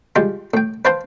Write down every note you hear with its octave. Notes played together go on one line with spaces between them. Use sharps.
G3 G#3 F4 G4
A2 G5
B4 C5 F5 G5 A5 C6